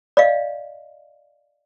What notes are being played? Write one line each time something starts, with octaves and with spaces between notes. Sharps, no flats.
D5 D#5 F5